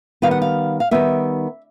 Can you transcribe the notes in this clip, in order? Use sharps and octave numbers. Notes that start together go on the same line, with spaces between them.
D#3 G3 B3 F5
F#5
F5
F5
D#3 G3 B3 E5